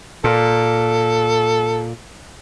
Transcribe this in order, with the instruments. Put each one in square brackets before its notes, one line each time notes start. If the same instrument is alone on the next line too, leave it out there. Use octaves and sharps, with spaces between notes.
[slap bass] A#2 [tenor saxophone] A4